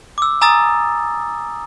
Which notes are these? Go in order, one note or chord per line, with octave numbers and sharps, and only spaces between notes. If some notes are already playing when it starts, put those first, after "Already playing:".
D6 E6
G#5 A#5 D#6 E6 A6